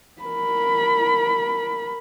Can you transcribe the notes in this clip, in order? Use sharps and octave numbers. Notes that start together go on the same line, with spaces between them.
A#4 B5